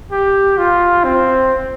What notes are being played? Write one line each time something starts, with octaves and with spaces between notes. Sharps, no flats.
G4
F4
C4